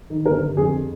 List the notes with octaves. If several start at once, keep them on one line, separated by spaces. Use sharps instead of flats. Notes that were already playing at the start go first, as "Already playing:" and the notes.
D#3
G1 A#4
G1
F2 G#4